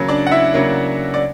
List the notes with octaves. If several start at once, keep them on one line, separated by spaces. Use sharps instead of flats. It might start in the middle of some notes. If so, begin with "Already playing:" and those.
Already playing: C#3 F#3 A#3
D4 D5
F#5
E4 E5
C#3 F#3 A#3
D5